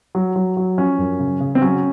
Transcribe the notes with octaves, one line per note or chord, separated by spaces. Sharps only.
F#3
F#3
F#3
F3 C#4
F#2
C#3
C#3
C4
F#3 C#4